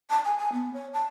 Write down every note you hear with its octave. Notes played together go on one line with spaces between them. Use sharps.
A5
G#5
G#5
B3
C#5
A5